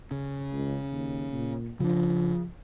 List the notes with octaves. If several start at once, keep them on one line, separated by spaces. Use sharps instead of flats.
C#3
C#2
D#2
A#2
C#3 F3 D4